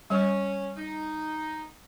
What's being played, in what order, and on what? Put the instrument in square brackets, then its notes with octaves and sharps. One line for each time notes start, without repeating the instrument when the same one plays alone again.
[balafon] G3 [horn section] C#4
[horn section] D#4